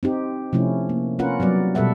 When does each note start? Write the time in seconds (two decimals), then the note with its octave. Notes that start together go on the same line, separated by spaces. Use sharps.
0.03 C4 D#4 G4
0.53 C3 F3 A3 C#4 E4
0.89 A#3
1.19 C#4 F4 A#4 B4 F#5
1.40 F#3 G3 B3 D5
1.75 B2 G3 A4 B4 E5 F#5